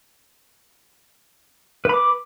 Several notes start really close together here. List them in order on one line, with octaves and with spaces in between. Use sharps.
B4 B5 D6